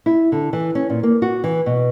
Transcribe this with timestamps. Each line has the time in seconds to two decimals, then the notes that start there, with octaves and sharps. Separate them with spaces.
0.06 E4
0.32 D3
0.53 E3
0.75 C#4
0.90 A#2
1.03 A#3
1.22 F#4
1.44 E3
1.66 B2